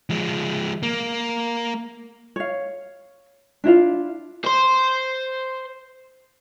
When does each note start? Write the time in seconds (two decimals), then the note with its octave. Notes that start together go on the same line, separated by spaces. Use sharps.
0.10 F3 G#3
0.83 A#3
2.36 C#5 F5
3.64 D4 E4 F4 F5
4.45 C5 C6